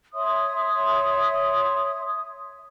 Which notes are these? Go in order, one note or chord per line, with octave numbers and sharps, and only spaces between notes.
C#5 E5 C6 D#6